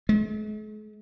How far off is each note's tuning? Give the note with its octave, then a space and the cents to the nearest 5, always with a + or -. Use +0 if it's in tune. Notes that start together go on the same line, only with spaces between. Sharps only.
G#3 +45